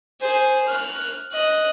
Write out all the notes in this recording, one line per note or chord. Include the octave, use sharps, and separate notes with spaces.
G#4 C5
F6 F#6
D#5 F#6